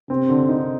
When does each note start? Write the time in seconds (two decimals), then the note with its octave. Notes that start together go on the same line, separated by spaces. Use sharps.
0.10 C3 C4
0.29 D3
0.49 D#4